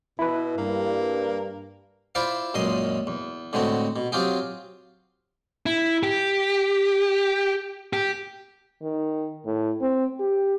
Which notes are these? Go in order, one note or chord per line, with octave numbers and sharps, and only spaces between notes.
B2 E4 B4
G2 A#3
E4 F4 C5 D5 E5
C#2 F#2 A#2 D#5 C6
E2
A2 D3 G#3 C4 F#4
B2
F#3 C4 F4 G4 G#4
E4
G4
G4
D#3
A2
C4
G4